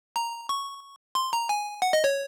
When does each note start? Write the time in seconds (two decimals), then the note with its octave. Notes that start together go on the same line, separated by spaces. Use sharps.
0.16 A#5
0.49 C#6
1.15 C6
1.33 A#5
1.49 G#5
1.82 F#5
1.93 D#5
2.04 C#5